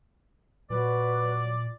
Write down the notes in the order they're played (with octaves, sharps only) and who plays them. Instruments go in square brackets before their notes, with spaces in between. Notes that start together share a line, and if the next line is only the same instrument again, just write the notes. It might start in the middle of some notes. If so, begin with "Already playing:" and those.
[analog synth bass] A#2 [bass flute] F#3 [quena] B4 [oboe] D5